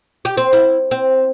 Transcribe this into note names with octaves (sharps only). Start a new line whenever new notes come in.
G4
C4
E4
C4